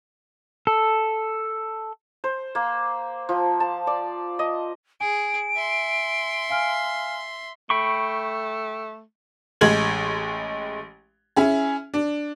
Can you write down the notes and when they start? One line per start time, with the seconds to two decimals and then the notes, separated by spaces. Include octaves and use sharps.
0.67 A4
2.24 C5
2.55 A#3
3.29 F3
3.60 A5
3.87 D5
4.39 D#5
5.01 G#4 G#5 D7
5.56 E5 C6
6.50 F5 G#5 F6
7.70 A3 G5 B5 C#6
9.61 A1 G#3 G#6 F#7
11.36 C#4 E4 G#4
11.94 D4